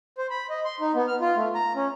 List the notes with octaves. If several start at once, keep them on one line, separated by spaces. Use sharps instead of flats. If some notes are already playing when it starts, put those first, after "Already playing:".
C5
B5
D#5
C6
D#4
B3
F6
F4
A3
A#5
C#4